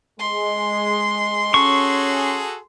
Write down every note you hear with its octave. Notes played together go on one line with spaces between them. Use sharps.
G#3 C6
C#4 F#4 G#4 A4 C#6